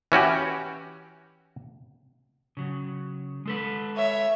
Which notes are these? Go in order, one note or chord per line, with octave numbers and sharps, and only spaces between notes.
E3 C#4 F#4 G4
C#3 F#3
G#3 A4 B4
C#5 E5